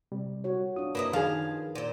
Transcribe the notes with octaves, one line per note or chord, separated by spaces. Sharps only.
C3 G3
F#4 C#5
D4 F4 D#6
F#2 A#3 E4 B4 D#5
D#3 F3 G#4 F5
A#2 C5